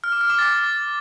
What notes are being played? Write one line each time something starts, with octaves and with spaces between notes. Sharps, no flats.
F6
D6
F6
D6
A6